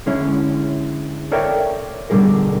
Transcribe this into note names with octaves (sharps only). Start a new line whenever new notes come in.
D3 G#3 C#4 E4 C#5
A4 A#4 C#5 D5 E5 G5
B2 D3 G3 G#4 A#4